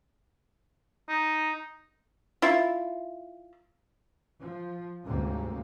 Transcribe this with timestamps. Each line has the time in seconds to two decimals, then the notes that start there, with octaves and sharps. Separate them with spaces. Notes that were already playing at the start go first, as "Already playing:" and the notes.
1.09 D#4
2.42 E4 F4
4.40 F3
5.06 D2 G#2 C3 G3 A#3 C#4